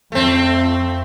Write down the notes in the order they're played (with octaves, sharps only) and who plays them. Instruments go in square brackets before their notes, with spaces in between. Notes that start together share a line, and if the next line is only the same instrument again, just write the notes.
[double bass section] F2 [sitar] A3 C4